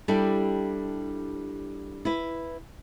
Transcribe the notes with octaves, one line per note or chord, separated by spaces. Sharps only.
G3 D4 E4 G4 A4
E4 B4